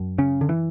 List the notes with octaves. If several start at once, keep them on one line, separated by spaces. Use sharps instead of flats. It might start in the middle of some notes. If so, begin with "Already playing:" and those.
Already playing: F#2
C#3 C#4
D3
E3